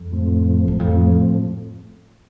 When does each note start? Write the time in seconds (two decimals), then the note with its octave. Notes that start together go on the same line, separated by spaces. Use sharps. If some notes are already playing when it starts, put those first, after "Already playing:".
Already playing: F2
0.11 A2 F3 A3 C4
0.68 E2
0.79 F2 A2 F3 A3 C4